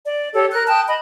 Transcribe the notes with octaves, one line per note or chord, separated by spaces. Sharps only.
D5
G4 A4 C#5
A#4 F#6
G5 A5 D#6 F#6
D#5 B5